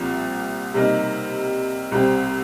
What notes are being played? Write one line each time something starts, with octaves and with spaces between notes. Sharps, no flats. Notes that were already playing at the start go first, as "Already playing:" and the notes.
Already playing: C2 A#2 F3 C4
C3 G3 A#3 D#4
C2 C3 G3 C4